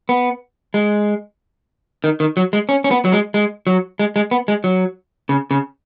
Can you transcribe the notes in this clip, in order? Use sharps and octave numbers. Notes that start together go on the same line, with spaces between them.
B3
G#3
D#3
D#3
F#3
G#3
C#4
C#4
B3
F#3
G#3
G#3
F#3
G#3
G#3
B3
G#3
F#3
C#3
C#3